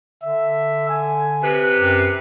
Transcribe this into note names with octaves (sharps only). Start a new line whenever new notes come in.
D3 E5
G#5
C3 B4
F#2 G4